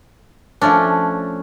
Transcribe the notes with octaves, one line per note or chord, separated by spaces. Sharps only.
F3 A3 C#4 D4